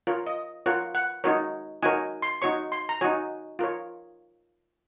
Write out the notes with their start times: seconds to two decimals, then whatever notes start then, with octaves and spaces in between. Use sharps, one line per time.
0.07 F4 A#4 C#5
0.27 D#5
0.66 F4 A#4 C#5 F#5
0.95 F#5
1.24 D#4 F#4 A#4 C#5
1.82 D#4 F#4 A#4 C#5 G#5
2.22 C6
2.42 D#4 F#4 C#5 C#6
2.72 C6
2.89 A#5
3.01 D#4 F#4 C#5 G#5
3.59 F4 A#4 C#5